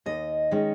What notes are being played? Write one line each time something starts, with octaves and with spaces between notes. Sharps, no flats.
D#2 D#5
D#3 G#3 C#4